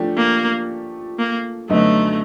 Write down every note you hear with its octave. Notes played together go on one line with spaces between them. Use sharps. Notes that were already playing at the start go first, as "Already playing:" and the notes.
Already playing: F3 A3 D4 G4
A#3
A#3
F#2 D3 F#3 A3 B3 D#4